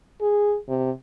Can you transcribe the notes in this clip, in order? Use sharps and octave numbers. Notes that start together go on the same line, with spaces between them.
G#4
C3